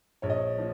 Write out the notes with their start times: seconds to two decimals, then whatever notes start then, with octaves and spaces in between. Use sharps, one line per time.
0.22 A#1 C#5
0.30 D#5
0.37 C#5
0.58 F3